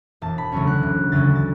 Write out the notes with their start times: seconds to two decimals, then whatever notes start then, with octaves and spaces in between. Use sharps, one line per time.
0.22 E1 A5
0.38 B5
0.52 D2 C#3 F#3 C#4 C#6
0.67 F#6
0.83 E1
1.12 D2 C#3 F#3 C#4 A6
1.35 A6